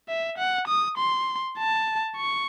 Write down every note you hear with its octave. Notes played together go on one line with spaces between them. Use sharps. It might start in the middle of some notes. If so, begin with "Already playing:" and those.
E5
F#5
D#6
C6
A5
C#6